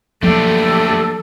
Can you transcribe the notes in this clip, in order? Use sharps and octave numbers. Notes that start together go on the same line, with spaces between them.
F3 F#3 A3 A#3 D4 G4 A4